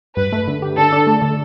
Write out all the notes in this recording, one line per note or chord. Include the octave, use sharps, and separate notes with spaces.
G2 B4
A3
D3
G4
D3 A4
D4
A3
D3